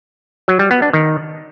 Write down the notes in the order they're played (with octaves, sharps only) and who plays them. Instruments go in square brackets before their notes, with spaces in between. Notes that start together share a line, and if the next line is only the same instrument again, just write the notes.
[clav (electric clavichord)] F#3
G3
B3
D4
D#3